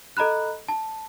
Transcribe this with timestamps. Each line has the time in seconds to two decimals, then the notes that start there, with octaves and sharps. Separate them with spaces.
0.17 A4 D#5 A#5 B5 F#6
0.68 A5